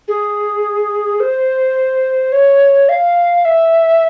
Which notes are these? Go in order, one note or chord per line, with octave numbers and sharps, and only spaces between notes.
G#4
C5
C#5
F5
E5